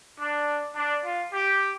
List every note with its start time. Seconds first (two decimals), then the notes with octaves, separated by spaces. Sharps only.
0.19 D4
0.76 D4
1.04 F4
1.33 G4